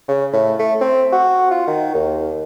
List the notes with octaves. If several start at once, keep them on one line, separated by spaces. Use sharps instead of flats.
C#3
A2
A3
C4
F#4
F4
D#3
D#2